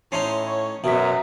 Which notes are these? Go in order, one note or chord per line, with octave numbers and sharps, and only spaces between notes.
A2 C#4 D#4 A5 C6 C7
C#5
F#2 B2 D#4 E5 B6